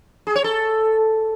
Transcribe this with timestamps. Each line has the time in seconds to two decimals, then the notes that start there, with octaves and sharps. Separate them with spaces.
0.27 G#4
0.36 C#5
0.44 A4